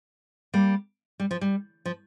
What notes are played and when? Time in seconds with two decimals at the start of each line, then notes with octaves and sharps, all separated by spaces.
0.54 G3 A#3
1.20 G3
1.31 F3
1.41 G3
1.85 F3